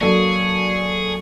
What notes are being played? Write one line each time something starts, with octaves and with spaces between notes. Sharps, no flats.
F#3 A#3 D4 G#4 A4 C#6